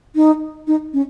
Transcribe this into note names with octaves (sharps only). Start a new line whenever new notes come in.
D#4
D#4
C#4